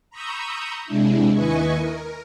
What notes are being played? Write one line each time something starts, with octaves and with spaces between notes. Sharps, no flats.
A#5 B5 C#6 D#6 E6 G6
C3 G#3 D4 E4
D#2 E4 B4 D#5 G#5 C#6
A#4